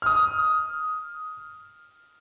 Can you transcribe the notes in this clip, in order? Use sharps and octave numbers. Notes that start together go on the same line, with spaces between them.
D#6 F6